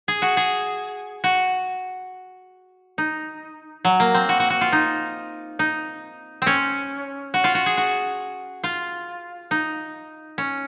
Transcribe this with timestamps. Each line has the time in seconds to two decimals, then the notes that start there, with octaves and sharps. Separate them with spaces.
0.08 G#4
0.22 F#4
0.37 G#4
1.24 F#4
2.98 D#4
3.85 F#3
4.00 A#3
4.14 C4
4.29 F#4
4.40 F#4
4.50 F#4
4.61 F4
4.73 D#4
5.59 D#4
6.42 C4 C#4
7.34 F#4
7.44 F4
7.55 F#4
7.66 G#4
7.77 F#4
8.64 F4
9.51 D#4
10.38 C#4